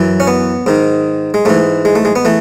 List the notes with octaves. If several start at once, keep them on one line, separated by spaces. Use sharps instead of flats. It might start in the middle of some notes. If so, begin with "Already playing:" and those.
Already playing: F#2 E3
C#4
B3
G#2 D#3
G#3
G#2 E3 A3
G#3
A3
G#3
B3
E3 A3